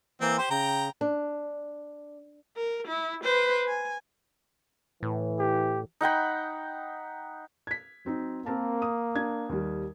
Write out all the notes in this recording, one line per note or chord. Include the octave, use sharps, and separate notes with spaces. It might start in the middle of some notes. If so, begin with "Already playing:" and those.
E3 A#3 C4
G4 C5
C#3 G5 A#5
D4
A#4
E4
B4 C5
G#5
A2 E3
G4
D#4 F#5 G5 B5
G#6 B6
F#3 C4 D#4
A#3 C4 A#4 A5
D#6
D4 G#6
D#2 G3